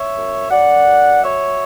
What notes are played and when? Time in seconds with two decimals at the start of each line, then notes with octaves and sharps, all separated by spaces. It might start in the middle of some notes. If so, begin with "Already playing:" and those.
Already playing: C#5 E5
0.16 F#2
0.51 F#2 D5 F#5
0.87 F#2
1.23 F#3 C#5 E5